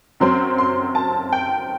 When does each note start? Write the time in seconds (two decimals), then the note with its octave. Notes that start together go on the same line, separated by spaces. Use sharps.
0.20 F#2 F#3 C4 C6
0.58 C6
0.95 A5
1.33 G5